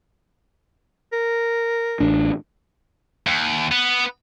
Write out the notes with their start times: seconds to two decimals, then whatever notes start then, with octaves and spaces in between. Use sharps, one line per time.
1.13 A#4
2.00 A1 D4
3.27 D#2
3.72 B3